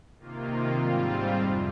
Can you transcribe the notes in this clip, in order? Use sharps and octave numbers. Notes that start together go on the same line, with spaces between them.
C3 D#3 A#3 F4
G#2 G3 C4 F4
F2 C3